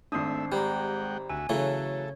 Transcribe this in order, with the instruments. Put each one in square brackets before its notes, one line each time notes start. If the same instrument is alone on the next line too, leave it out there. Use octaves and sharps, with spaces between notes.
[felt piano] G#1 C4 D#6 [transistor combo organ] A3 E5 [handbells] D4 C7
[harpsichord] G3 [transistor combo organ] G#3 F#5 G5 [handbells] G4 C5 A#5
[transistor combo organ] D2 F#4 E5 [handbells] G#5
[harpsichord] C#3 A3 [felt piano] E3 F#3 [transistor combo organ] A4 [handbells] C#5